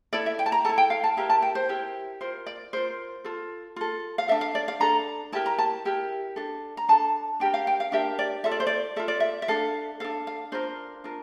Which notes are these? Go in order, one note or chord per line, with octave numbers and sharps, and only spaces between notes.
E4 A4 D5
E5
G5
A5
A#5
E4 A4 A5
G5
F5
A5
E4 G4 A#4 A#5
A5
G5
C5
E4 G4 A#4
F4 A#4 C5
D5
F4 A#4 C5
F4 A4
F4 A4
F5
D4 A4 E5
F5
D5
F5
D4 A4 A#5
E4 G4 A#4 A5
A#5
A5
E4 G4 A#4
D4 A4
A#5
D4 A4 A5
D4 G4 A#4 G5
F5
G5
F5
D4 G4 A#4 E5
D5
F4 A4 E5
D5
C5
D5
F4 A4 E5
D5
E5
E5
D4 A4 F5
D4 A4 F5
F5
D4 F4 A#4 C5
D4 F4 A#4